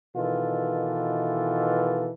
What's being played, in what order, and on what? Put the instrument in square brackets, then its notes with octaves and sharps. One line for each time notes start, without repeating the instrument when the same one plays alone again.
[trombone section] B2 D#3 E3 F4 A4